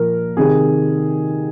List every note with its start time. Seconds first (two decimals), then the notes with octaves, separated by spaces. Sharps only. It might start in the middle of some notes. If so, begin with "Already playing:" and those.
Already playing: A#2 F3 A#4
0.37 C3 D#3 G#4